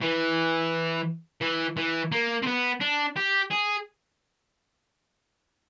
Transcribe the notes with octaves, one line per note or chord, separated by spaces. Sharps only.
E3
E3
E3
A#3
C4
B3
D4
G4
G#4